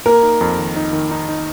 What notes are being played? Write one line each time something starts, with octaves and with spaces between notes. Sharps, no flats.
A#3 A#4
D#4
F2
D#3
D#4
D#3
D#4
D#4